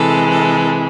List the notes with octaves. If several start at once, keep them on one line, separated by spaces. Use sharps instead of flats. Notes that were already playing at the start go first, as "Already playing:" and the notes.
Already playing: C3 E3 G#3 A4
A4